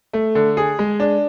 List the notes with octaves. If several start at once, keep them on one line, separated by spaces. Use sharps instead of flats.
A3
D3
G#4
G#3
D4